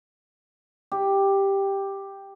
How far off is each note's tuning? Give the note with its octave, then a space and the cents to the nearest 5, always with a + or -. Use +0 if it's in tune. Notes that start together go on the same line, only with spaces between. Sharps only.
G4 +5